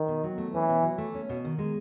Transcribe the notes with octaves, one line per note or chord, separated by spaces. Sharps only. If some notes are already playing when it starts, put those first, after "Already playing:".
Already playing: D#3
B2
F#3
A3
E3 C#4
B2
F#3
A3
C#4
B2
D#3
G#3